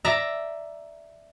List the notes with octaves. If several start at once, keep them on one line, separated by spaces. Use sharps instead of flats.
D5 E5 A#5